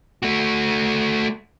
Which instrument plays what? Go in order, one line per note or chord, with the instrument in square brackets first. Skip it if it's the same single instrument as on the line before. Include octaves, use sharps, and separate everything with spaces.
[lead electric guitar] A3 F#4